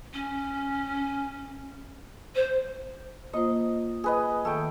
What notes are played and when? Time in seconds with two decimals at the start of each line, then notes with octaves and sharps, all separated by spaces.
0.14 C#4
2.35 C5
3.33 A#3 F4 C5 D#5
4.04 G#4 B4 D#5
4.45 D#3 A3 G5